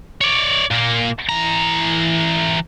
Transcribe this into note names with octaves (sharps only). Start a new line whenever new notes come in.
C#5 D5
A#2 A#3
E3 A#5